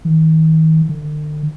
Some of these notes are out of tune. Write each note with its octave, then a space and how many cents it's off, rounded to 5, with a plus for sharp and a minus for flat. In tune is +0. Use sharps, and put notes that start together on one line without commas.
D#3 +40
D3 +40